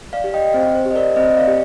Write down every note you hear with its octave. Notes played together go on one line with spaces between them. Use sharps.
D5 F5
G4
D#5 G5
C4 C5
C5
G4
D#5
A#4 D5
C4 C5 D#5
D5 F5
G4